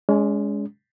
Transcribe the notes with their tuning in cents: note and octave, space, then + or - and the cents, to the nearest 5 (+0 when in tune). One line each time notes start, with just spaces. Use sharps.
G#3 +0 C#4 +40